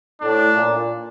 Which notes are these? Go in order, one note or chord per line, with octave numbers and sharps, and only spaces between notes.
A2 D4
A#2